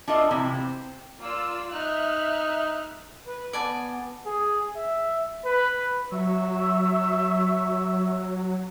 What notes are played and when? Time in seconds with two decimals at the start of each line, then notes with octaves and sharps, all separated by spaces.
0.08 D4 F4 A4 D#5 E5
0.31 C3 E3 F3 E4
0.54 C4
1.20 A#3 F4 D5 E6
1.74 D#4 E5 F6 F#6
3.27 B4
3.53 B3 D5 G#5 A5
4.26 G#4
4.76 E5
5.45 B4
6.12 F#3 E5 C#6 E6